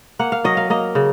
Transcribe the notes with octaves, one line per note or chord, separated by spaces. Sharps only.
A#3 F#5
F5
F#3 D#5
F5
A#3 D#5
C#3